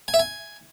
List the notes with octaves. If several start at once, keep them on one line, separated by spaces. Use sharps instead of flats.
G#5
E5
G#5